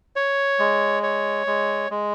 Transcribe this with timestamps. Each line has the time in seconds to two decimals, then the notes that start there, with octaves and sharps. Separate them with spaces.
0.16 C#5
0.59 G#3
1.03 C#5
1.47 G#3
1.91 G#3